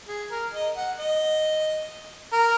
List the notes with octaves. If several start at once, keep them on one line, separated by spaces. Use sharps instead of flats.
G#4
A#4
D#5
F#5
D#5
A#4